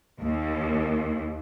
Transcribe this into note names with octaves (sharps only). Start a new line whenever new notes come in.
D#2